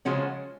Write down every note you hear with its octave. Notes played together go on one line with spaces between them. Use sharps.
C#3 F3 G#3 C#4 F#4